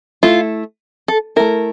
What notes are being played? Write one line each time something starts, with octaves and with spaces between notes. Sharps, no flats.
A3 E4 F4
A4
A3 E4 A#4